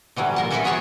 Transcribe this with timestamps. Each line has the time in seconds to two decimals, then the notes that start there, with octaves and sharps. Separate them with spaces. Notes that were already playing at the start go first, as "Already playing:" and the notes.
0.16 D3 E3 F#3 G3
0.36 A#2 A#4 A5
0.51 E3 E4 A4 D5 E5 G#5
0.64 F#4 G#4 A#4 C#5 A5